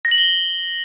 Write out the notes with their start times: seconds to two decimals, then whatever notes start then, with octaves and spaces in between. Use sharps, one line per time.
0.05 A#6
0.11 F#7
0.18 G7